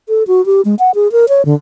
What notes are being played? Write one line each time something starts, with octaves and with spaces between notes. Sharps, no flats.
A4
F#4
G4
G#3
F#5
G#4
A#4
C#5
D3